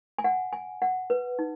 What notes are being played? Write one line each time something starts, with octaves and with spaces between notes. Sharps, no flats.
G#5
F#5
G#5
F#5
B4
D#4